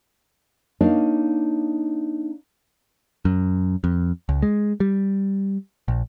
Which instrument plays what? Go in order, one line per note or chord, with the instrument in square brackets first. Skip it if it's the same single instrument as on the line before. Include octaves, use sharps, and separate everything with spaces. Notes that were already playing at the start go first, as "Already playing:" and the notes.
[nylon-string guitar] A#3 D4 D#4 C#5 D#5 F5
[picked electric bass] F#2
F2
C#2
G#3
G3
A#1